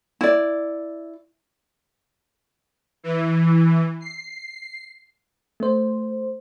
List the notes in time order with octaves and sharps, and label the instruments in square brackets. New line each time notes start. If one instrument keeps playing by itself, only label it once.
[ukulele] E4 D5
[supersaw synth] E3
C7
[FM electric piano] A3 C5